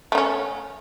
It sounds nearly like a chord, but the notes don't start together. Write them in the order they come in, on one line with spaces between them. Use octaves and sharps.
A3 D#4 C#4